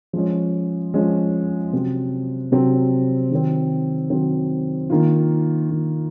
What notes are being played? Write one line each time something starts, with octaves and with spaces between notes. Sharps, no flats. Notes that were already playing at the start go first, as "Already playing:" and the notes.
F3 G#3 C#4
F3 G#3 C#4
C3 F#3 C4
C3 F#3 C4
D#3 F#3 C4
D#3 F#3 C4
D#3 A#3 F4
D#3 A#3 F4